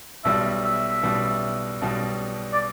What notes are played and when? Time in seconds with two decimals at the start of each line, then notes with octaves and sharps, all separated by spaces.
0.24 B1 B2 G3 E5
0.64 E5
1.03 B1 B2 G3
1.81 B1 B2 G3
2.53 D5